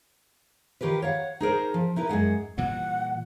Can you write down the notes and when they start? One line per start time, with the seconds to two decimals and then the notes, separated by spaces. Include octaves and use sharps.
0.81 D#3 F4 G4 A#4 B4
1.02 C#5 F5 F#5
1.40 D#4 G#4 A#4 C5
1.74 F3
1.96 D#4 E4 A#4 B4
2.09 F#2 D#3 G#3 F#5
2.58 A#2 E3 G3 F#5